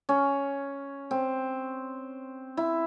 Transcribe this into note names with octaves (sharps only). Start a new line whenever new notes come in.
C#4
C4
E4